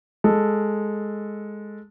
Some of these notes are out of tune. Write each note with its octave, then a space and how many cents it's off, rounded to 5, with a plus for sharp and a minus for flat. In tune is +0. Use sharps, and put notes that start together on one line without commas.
G#3 +0 A4 +0